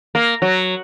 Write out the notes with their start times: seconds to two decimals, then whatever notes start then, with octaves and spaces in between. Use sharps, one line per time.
0.15 A#3
0.42 F#3